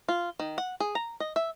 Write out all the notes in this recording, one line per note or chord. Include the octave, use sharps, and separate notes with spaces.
F4
D#3
F#5
G#4
A#5
D#5
E5